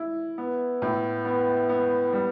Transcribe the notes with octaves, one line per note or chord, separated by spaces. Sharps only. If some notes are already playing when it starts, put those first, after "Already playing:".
Already playing: E4
B3
A2
B3
B3
G3